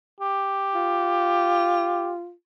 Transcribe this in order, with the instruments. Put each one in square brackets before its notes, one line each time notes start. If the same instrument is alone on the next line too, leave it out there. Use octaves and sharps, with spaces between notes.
[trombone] G4
[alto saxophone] F4